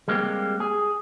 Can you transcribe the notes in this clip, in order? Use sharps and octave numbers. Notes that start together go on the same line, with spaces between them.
G3 G#3 A#3 C4 F#4 G4
G#4